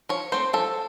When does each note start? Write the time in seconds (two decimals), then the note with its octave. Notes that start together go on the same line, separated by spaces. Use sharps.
0.09 F3 C#5
0.32 A3 C4 C5
0.53 F3 A4